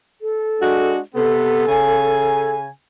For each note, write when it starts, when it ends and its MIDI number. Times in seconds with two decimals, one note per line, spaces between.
0.21 0.92 69
0.61 0.99 56
0.61 0.99 62
0.61 0.99 66
1.15 1.67 48
1.15 1.67 59
1.15 2.55 69
1.67 2.68 49
1.67 2.68 80